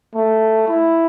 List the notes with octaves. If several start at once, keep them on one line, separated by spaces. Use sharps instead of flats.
A3
E4